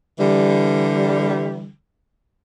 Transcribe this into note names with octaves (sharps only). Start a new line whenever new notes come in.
D3 E3 G3